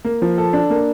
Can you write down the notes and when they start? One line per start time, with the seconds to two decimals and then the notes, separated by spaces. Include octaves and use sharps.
0.05 A#3
0.22 F3
0.38 A4
0.53 D4
0.70 A#3